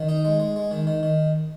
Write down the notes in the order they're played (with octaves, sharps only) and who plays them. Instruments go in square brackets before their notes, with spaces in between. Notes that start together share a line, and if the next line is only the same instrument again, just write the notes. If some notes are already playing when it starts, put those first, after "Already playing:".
Already playing: [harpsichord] D#3
D#4
G#3
G#3
G#3
D#3
D#3
D#3